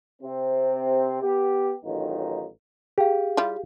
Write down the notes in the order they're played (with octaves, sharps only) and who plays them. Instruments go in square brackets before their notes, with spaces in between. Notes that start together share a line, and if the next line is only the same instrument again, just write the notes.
[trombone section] C3 C4
B3 G4
A1 D#3 F#3 D#4 F4
[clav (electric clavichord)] G4 [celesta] G#4 F5
[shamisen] G3 E4 F4